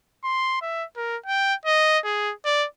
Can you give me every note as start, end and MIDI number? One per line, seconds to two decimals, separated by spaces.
0.24 0.59 84
0.62 0.84 76
0.96 1.17 70
1.26 1.54 79
1.65 1.99 75
2.05 2.33 68
2.45 2.66 74